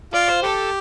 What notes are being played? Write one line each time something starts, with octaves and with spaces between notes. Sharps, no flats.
F4 D5
C5
G4 A4